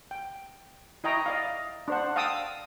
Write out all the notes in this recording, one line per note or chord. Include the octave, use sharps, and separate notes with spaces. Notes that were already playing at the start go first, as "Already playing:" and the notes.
G5
E4 D#5 G5 A#5 C#6
D5 D#5 F5
D4 C5 F#5
F5 G5 A5 D#6 E6